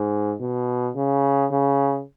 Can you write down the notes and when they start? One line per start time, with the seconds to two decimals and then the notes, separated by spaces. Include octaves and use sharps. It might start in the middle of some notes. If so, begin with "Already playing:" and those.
Already playing: G#2
0.40 B2
0.95 C#3
1.51 C#3